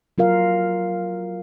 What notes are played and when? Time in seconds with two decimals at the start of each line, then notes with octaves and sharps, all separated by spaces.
0.18 F#3 F4 A#4 F5